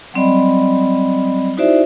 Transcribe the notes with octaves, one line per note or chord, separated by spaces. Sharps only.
F#3 G3 C4 D5 D#5 B5
D#4 E4 F#4 C5 D5 E5